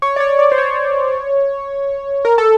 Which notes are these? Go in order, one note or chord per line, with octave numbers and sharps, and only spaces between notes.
C#5
D5
C#5
D5
C5
C#5
A#4
A4